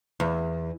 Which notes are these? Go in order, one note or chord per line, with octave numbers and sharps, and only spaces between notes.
E2